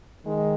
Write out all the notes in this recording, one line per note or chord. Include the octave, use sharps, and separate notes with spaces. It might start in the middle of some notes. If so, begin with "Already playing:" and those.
D#3 G#3